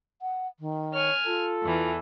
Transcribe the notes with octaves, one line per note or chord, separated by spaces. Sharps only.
F#5
D#3
C#5 G#5 F6
F4 A4
E2 E3